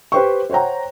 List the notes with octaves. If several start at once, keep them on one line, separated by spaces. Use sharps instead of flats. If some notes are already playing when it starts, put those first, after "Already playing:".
G4 B4 C5 G5 C#6
C5 C#5 F#5 G5 A#5